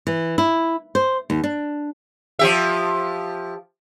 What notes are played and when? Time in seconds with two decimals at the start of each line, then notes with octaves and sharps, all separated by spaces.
0.07 E3
0.38 E4
0.95 C5
1.30 D#2
1.44 D4
2.39 F3 G4 E5